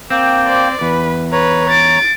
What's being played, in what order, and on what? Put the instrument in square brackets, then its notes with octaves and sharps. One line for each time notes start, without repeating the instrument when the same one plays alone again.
[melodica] A#3 G5 [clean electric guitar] C4
[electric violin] C5 D5
[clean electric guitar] E2 [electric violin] B4 [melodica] B5
[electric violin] B4 [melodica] C#5 A#5
[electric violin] A6 D7